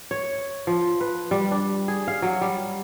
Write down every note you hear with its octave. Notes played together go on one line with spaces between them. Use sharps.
C#5
F3
B4
G3
D4
G#4
F5
F#3
G3